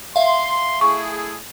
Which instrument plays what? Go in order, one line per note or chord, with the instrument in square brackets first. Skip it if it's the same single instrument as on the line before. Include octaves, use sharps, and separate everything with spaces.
[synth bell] E5 F5 [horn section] C6
[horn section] A3 E4 G#4 [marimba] C#6